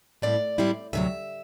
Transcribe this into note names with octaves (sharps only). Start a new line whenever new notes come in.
A2 G3 C4 E4 D5
A2 G3 C4 E4
D2 C3 F#3 E5